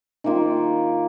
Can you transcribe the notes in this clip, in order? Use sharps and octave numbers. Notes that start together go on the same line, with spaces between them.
D#3 A#3 F4